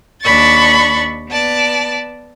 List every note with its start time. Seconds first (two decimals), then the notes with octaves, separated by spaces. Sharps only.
0.22 D#2 D4 B5 C#6 A6
1.30 B3 D5 A5